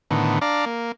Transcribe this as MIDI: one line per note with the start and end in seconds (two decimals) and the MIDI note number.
0.11 0.39 45
0.11 0.39 50
0.11 0.39 51
0.11 0.39 59
0.41 0.65 62
0.41 0.65 74
0.41 0.65 77
0.41 0.65 82
0.66 0.92 58